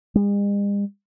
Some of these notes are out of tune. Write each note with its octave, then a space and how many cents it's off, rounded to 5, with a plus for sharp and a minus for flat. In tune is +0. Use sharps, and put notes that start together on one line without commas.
G#3 -45